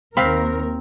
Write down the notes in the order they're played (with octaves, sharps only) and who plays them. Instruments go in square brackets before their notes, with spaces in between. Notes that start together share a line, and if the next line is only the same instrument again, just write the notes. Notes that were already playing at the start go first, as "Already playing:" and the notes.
[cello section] D#2 A#4 [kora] C4 [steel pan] F5 B5